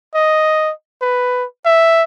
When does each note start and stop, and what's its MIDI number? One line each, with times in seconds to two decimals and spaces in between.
0.15 0.72 75
1.02 1.45 71
1.65 2.04 76